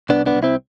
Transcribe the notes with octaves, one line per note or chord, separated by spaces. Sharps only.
C2 B3 D4
B3 D4
C2
C4 E4